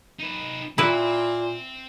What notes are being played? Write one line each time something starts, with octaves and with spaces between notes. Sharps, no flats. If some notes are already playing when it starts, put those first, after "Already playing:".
D#4 B4
A#2 C4 E4 B4 G5